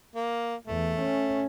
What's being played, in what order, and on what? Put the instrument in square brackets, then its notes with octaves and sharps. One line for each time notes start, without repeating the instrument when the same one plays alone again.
[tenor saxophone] A#3
[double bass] E2 [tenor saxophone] A3
[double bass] C#4